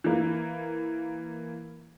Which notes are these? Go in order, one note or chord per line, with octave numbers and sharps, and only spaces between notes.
E3 A#3